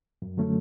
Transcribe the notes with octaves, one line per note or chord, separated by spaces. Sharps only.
F#2
D3 F#3 A3 C#4